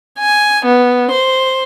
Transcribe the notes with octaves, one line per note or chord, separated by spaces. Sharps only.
G#5
B3
C5